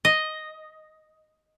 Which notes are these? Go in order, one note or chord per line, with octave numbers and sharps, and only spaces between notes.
D#5